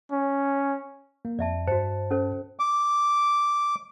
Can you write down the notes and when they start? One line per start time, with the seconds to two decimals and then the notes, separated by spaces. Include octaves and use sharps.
0.12 C#4
1.25 A#3
1.39 F2 D5 E5 A5
1.67 G2 F#4 C5 A5 C#7
2.11 C#4 A4 C5
2.59 D6